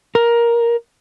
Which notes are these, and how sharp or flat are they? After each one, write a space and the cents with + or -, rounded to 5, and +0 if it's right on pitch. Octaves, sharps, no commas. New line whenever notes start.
A#4 +10